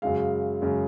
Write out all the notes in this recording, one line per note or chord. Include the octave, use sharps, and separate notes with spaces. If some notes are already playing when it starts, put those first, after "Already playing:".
F#2 C#3 G#3 F5
F#2 C#3 G#3